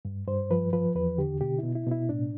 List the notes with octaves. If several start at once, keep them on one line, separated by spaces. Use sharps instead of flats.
G2
G2 C5
F3 B4
F3 B4
E2 B4
D3 G4
B2 G4
B2 E4
E4
B2
E4
A2 D4